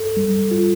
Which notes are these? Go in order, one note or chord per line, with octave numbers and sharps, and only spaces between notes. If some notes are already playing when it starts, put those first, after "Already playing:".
Already playing: A4
G3
F4